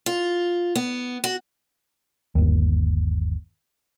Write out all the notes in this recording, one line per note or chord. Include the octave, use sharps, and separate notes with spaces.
F4
B3
F#4
G1 D#2